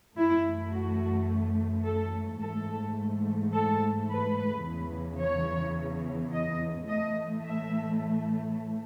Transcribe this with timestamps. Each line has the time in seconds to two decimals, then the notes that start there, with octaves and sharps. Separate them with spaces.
0.17 F#2 E3 A3 E4
0.73 F#4
1.85 A4
2.41 G#2 E3 A3 A4
3.53 A4
4.09 B4
4.65 E2 C#3 E3
5.21 C#5
6.33 D#5
6.88 A2 E3 A3 D#5
7.45 E5